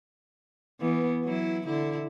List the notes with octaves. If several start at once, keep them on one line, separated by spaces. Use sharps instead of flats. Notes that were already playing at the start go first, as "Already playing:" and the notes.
E3 B3
F#3 E4
D3 E4